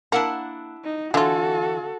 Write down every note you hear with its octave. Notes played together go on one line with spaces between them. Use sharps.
A#3 D4 E4 F#5
D#4
D3 E3 F4 F#4 A4